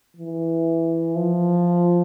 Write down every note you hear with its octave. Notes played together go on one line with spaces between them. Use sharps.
E3
F3